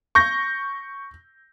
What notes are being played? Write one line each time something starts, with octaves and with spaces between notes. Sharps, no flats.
C#6 G6 A#6